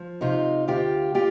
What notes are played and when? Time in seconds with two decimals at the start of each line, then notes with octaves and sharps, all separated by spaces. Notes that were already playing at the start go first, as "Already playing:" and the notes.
Already playing: F3
0.21 C3 D#4 F4
0.68 D2 F4 G4
1.15 F4 G4